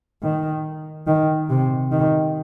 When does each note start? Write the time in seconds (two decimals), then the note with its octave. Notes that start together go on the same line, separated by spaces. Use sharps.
0.22 D#3
1.07 D#3
1.49 C3
1.91 D#3